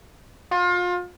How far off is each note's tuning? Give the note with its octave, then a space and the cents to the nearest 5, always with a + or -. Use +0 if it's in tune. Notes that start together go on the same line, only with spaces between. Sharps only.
F4 +30